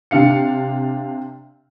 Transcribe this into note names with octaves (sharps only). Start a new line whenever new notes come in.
C3 D4 F5 C#7